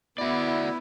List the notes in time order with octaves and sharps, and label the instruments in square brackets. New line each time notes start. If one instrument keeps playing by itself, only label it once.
[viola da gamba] B3 [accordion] E4 [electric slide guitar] F#4 D5